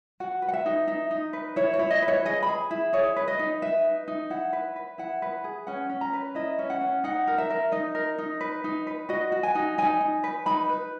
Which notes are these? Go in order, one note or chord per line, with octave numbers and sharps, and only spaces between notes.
F#4 F#5
B4
F#5
E5
D#4
D#4 E5
D#4
B4
E4 C#5
C#5
E4
D#5
B4
C#5
G#4 D#5
B5
G#4
E4
G#4 C#5
B4
D#5
D#4
B4 E5
D#4
D#4
E4 F#5
B4
B4
E4 F#5
B4
G#4
C#4 F#5
C#4
A#5
B4
E4 D#5
C#4
F#5
C#4
D#4 F#5
A#4
E5
A#4
D#4 D#5
A#4
D#4
B4
D#4
B4
F#4 D#5
F#4
G#5
D#4
D#4 G#5
D#4
B4
D#4 B5
B4